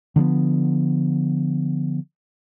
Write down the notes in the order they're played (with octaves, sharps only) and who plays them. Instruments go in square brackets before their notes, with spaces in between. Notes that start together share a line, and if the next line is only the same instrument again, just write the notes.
[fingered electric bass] D3 F3 A3 B3